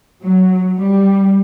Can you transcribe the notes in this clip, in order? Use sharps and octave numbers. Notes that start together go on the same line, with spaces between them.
F#3
G3